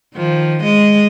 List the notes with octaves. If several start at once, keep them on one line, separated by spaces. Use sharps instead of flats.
D#3 F3
G#3 D#5